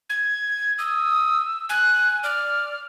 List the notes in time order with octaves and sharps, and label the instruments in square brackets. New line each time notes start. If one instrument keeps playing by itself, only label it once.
[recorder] G#6
[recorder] D#6 [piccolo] E6
[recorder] G#5 [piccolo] F#6
[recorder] D5 [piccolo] F6